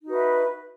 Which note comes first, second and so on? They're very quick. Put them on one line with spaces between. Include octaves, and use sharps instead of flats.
D#4 F#4 B4 E5